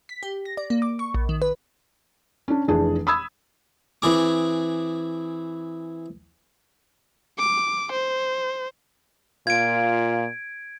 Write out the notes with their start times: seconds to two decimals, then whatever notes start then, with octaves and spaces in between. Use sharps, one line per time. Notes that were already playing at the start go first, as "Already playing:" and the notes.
0.09 B6
0.23 G4
0.45 A#6
0.57 D5
0.70 A#3
0.82 D6
0.99 C#6
1.15 A#1
1.29 D#3
1.42 B4
2.48 C#4 D4
2.68 F1 E3 D4 G#4
3.07 B5 D#6 E6 G#6
4.02 E3 C4 G#4 D6
7.38 D6
7.92 C5
9.47 A#2 F4 G#6 D7